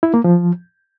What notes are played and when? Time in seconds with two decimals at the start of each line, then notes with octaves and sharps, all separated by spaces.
0.03 E4
0.14 A#3
0.24 F3